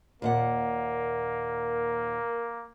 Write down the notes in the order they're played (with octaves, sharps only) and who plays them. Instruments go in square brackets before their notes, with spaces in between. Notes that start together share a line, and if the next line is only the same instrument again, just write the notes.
[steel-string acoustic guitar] D#2 A#2 F#5 [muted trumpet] A#3 [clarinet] A#4